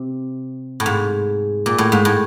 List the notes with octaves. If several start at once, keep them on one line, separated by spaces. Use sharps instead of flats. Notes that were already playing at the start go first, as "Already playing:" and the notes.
Already playing: C3
A2
G#2
A#2
A2
G#2
A2